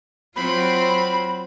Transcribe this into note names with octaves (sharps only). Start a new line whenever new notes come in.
F#3 C4 F4 B5